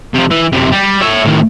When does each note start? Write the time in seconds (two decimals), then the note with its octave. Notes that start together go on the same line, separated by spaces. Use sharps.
0.14 C3 F3
0.31 E3
0.52 F#2 C3
0.72 G3
1.02 C#5 E5
1.26 A2 D#3